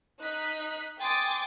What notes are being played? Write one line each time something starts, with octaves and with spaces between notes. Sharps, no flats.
D#4 F#6 B6
G5 G#5 C6 D6 D#6 A6